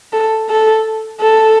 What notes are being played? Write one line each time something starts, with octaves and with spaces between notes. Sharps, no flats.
A4
A4
A4